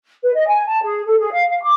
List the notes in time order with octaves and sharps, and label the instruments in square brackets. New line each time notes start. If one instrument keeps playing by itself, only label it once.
[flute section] B4
D#5
G#5
A5
G#4
A4
G#4
F5
F5
D6